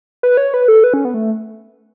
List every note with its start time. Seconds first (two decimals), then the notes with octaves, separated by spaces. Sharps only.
0.23 B4
0.37 C#5
0.54 B4
0.68 A4
0.84 B4
0.94 C#4
1.05 B3
1.14 A3